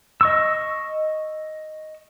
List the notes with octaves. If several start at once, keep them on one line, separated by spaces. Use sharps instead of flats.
D#5 C#6 E6